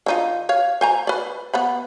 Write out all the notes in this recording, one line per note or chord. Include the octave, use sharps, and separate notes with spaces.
D3 D#4 F4
C#5 F5
C5 G#5 A#5
B4 D5
B3 F#5 B5